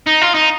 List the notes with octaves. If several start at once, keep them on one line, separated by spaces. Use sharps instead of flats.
D#4
F4
D#4